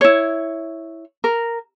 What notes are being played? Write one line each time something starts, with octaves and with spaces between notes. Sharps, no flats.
E4 C#5
A#4